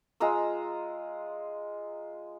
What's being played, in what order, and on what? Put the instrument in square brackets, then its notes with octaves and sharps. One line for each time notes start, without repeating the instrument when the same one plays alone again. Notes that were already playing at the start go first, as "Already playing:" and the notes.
[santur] G#3 F4 A#5 E6